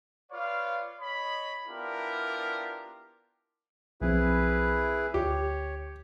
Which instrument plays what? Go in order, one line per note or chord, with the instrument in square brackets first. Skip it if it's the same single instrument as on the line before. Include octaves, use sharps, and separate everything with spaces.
[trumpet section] F4 B4 C#5 D5 F5
C#5 D#5 B5
B3 D4 E4 F4 G4 A#4
[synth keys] B1 F3 C4 [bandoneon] E4 G#4 B4
[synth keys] D2 [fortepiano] G4 [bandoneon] C#5